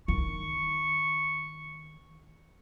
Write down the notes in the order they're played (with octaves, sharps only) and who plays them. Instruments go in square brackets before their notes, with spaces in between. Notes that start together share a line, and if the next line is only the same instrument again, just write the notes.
[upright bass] D#3 [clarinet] C#6